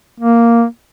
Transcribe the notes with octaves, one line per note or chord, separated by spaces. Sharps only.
A#3